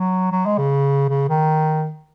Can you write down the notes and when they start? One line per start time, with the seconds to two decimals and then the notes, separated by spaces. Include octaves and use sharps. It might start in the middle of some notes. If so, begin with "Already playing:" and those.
Already playing: F#3
0.32 F#3
0.46 G#3
0.58 C#3
1.09 C#3
1.29 D#3